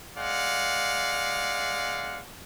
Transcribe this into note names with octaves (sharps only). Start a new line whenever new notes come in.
G#3 D5 F5 F#5